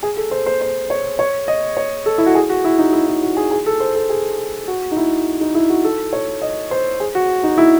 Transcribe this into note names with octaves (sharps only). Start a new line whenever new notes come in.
G#4
A4
C5
C5
C5
C#5
C#5
D#5
C#5
A4
E4
F#4
G#4
F#4
E4
D#4
E4
E4
F#4
G#4
G#4
A4
C5
A4
G#4
F#4
D#4
E4
D#4
E4
F#4
A4
C#5
D#5
C5
G#4
F#4
D#4
E4